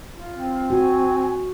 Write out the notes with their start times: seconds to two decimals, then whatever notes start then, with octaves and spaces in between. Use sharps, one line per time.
0.16 F4
0.32 C4
0.70 F#4 G#5